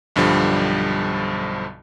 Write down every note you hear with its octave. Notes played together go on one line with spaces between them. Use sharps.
B1 G2 D3 F3 G3